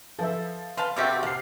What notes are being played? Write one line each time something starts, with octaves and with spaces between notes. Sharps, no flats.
F3 A4 B4 E5
B4 F5 A5 C6
C3 A#3 C4 F#4 G4 E5 D6 A6
C3 F3 F5 F#5 F6 C7